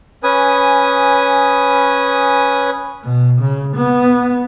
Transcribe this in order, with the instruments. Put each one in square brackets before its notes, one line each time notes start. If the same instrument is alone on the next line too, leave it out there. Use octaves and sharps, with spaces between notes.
[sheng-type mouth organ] C#4 B4 G#5 D#6
[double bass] B2
C#3
B3